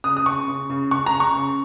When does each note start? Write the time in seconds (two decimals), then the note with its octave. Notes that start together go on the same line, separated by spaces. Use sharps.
0.04 C#3 D#6
0.17 D#6
0.26 C#3 C#6
0.48 C#3
0.70 C#3
0.91 C#3 C#6
1.06 A#5
1.14 C#3
1.20 C#6
1.36 C#3